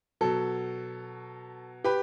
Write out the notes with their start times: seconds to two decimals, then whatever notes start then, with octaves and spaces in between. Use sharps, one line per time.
0.21 B2 F#3 A4
1.84 G4 B4